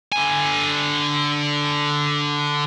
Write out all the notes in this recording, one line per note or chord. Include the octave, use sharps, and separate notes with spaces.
D3 G#5